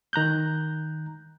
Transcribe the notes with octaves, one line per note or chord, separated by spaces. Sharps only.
D#3 A#5 F#6 G6